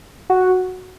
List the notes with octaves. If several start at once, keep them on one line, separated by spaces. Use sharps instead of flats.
F#4